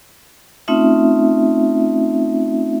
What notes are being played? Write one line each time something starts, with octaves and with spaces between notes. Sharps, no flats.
A3 C4 C#4 D#4 F4 E5